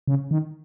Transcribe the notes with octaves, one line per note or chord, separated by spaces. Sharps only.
C#3
D#3